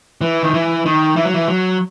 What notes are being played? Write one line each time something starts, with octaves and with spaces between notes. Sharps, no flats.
E3
D#3
E3
D#3
E3
F#3
E3
F#3